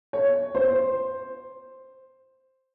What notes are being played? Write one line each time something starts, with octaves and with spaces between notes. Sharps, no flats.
C#5
C5